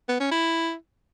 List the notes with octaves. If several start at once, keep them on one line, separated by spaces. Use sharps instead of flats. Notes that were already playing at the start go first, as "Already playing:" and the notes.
B3
C#4
E4